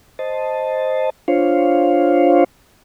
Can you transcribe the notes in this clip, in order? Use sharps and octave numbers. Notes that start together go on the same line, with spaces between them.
C5 D#5 A5
D4 F4 C5 C#5 F5